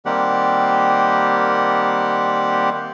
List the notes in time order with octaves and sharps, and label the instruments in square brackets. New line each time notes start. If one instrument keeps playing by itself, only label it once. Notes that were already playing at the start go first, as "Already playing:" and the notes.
[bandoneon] D#3 G3 A#3 C4 G4 F#5